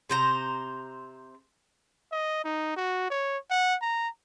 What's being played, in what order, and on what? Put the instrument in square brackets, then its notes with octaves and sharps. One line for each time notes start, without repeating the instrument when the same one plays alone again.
[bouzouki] C3 C5 A#5
[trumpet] D#5
D#4
F#4
C#5
F#5
A#5